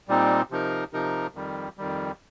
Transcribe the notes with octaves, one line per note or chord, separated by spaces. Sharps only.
A#2 G3 C4 D#4
C3 F3 D#4 A#4
C3 F3 D#4 A#4
F2 D#3 G3
F2 D#3 G3